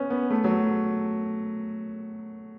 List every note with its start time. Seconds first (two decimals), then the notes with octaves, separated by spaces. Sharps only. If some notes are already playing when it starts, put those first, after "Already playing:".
Already playing: B3 C#4
0.10 B3
0.31 A3
0.44 F#3